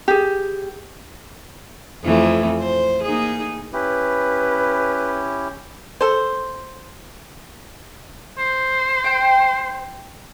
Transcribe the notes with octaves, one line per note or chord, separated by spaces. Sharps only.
G4 G#4
F2 E3 A3
C5
A#3 D#4 G#4
C#4 E4 G4 B4
A4 C5
C5
G5